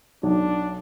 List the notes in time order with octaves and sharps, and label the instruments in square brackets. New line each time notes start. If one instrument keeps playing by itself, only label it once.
[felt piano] B1 [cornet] D4